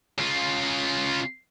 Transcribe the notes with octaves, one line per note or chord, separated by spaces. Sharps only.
C#3 F4